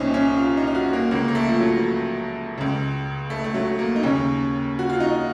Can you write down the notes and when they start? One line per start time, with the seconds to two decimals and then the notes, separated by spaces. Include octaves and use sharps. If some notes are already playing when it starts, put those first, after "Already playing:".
Already playing: C2 A#2 C4 C#4 D#4
0.14 C#4
0.38 F4
0.57 D#4
0.67 F4
0.75 F#4
0.93 A#3
1.11 C#2 C#3 A#3
1.28 A#3
1.35 A3
1.49 F3
1.60 F#3
2.58 C#2 C#3
3.30 A3
3.44 A3
3.54 F#3
3.79 A#3
3.96 D#4
4.03 D#2 C#3 C#4
4.79 F#4
4.90 F4
5.00 D#4